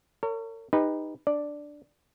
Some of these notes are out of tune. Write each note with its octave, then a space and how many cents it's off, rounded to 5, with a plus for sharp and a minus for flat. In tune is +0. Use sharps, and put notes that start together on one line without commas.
A#4 -45 C#5 +15
D#4 +0 G4 +30 B4 +0
D4 +0 D5 +0